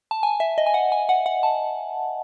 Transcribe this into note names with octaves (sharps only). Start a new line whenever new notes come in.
A5
G#5
E5
D#5
G#5
F#5
G#5
F#5
F#5
A5